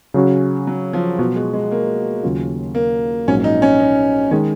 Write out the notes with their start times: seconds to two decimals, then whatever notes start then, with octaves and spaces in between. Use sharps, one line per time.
0.14 C#3 F#3 C#4 F#4
0.67 F#3
0.93 F3
1.19 B2 F3 F#3 B3 F#4
1.36 G#3
1.53 G#3
1.72 A#3
2.23 D#2 C#3 F#3 C#4 F4
2.75 A#3
3.28 A#1 G#2 F#3 A#3 C#4
3.44 D#4
3.62 C#4
3.80 D#4
4.31 D#3 G#3 C#4